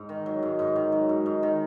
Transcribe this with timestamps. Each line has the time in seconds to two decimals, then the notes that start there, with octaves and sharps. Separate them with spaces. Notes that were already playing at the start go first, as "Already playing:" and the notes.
Already playing: G#2
0.09 D#3
0.26 F#3
0.43 G#2
0.59 G#2
0.76 D#3
0.92 F#3
1.09 G#2
1.26 G#2
1.43 D#3